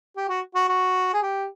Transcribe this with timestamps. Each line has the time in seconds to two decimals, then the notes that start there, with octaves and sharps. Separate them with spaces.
0.16 G4
0.29 F#4
0.55 F#4
0.69 F#4
1.13 G#4
1.22 G4